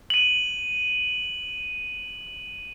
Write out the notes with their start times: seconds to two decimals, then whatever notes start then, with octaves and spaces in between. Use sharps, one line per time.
0.10 D#7 F#7